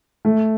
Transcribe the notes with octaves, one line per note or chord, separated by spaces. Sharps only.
A3